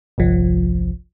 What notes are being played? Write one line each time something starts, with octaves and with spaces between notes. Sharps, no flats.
G1 C2 F3